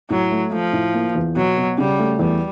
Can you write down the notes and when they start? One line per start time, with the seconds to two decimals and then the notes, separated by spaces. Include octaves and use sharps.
0.10 A2 F#3
0.31 A3
0.52 F3 A3
0.73 A2
0.94 A#3
1.15 E2
1.36 B2 F#3
1.57 B2
1.78 C#3 G3
1.99 A3
2.19 E2 G3